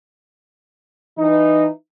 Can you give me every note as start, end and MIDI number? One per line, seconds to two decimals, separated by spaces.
1.19 1.68 52
1.19 1.68 63